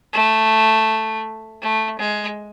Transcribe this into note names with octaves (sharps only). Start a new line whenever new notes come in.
A3
A3
G#3